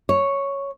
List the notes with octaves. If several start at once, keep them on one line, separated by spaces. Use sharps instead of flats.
C#5